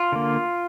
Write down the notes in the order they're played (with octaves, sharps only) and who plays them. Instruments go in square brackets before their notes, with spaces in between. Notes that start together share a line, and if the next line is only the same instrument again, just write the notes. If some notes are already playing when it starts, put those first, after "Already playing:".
Already playing: [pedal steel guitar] F4
D3 A#3